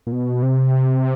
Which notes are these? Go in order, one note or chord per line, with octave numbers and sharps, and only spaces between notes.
A#2
B2
C3